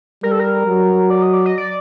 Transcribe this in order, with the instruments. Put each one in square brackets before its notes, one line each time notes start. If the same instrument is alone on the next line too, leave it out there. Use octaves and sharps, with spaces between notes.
[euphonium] G3 [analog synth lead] A#4
[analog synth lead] A4
A#4
[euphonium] F#3
[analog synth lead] D5
D#5
D5
D#5
D5